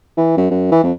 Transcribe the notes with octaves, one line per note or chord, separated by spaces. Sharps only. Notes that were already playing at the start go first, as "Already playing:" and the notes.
E3
F#2
F#2
E3
F2